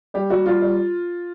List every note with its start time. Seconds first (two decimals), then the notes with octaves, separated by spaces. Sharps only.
0.14 G3 G4
0.30 G3 F#4
0.46 G3 F4
0.62 G3